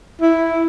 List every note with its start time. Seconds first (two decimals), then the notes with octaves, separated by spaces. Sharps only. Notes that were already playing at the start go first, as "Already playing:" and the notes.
0.21 E4